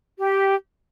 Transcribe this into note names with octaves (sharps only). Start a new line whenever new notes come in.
G4